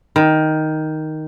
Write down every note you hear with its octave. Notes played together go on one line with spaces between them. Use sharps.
D#3